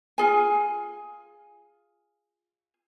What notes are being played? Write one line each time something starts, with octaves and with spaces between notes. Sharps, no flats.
F4 G#4 G#5